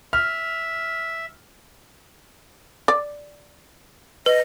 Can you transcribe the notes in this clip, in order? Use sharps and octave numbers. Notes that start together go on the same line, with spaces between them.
E5 F6
D5
B4 D#5